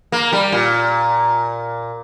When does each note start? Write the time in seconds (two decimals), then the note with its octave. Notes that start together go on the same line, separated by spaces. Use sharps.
0.12 A#3
0.33 G3
0.52 A#2